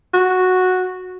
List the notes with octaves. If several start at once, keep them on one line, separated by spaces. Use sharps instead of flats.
F#4